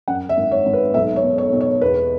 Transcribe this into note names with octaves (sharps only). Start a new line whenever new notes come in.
F#2 F#5
E5
G#1
C#5
G#1
B4
B1 E5
C#5
B2
C#5
B2
C#5
E2 B4